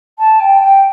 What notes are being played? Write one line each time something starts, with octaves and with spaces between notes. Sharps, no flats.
A5
G5
G5